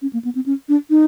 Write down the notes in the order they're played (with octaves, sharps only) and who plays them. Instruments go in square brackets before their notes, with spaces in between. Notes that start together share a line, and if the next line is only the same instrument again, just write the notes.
[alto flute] C#4
A#3
B3
C4
C#4
D4
D#4